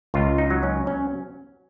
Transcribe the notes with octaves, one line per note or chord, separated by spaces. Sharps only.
C#2 F4
D#4
F#3
C#4
C#4